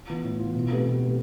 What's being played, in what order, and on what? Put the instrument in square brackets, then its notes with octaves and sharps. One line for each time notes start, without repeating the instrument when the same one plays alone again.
[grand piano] E3 B3 F4
A2
E3 B3 F4
B2
A3 C4 G4 B4
B2
A3 C4 G4 B4